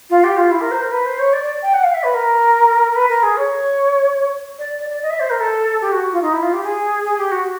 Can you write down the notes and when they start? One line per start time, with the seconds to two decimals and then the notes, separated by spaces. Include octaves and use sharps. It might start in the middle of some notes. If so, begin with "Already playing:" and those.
0.10 F4
0.24 G4
0.37 F4
0.51 E4
0.61 A#4
0.71 C5
0.82 A#4
0.92 B4
1.06 C5
1.19 C#5
1.33 D5
1.43 D5
1.63 G5
1.74 F#5
1.83 F5
1.94 E5
2.03 B4
2.14 A#4
2.92 A#4
2.96 B4
3.09 A#4
3.23 G#4
3.37 C#5
4.59 D5
4.79 D5
4.90 D5
5.02 D#5
5.10 E5
5.20 C5
5.30 A#4
5.40 A4
5.81 G4
5.92 F#4
6.12 F4
6.22 D#4
6.32 E4
6.42 F4
6.53 G4
6.63 G#4
7.04 G#4
7.18 G4
7.31 F#4